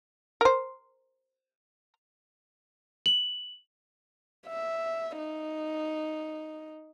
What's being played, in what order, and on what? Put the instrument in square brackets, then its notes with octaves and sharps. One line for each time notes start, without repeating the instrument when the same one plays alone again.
[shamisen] A#4 C5
[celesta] F#7
[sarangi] E5
D#4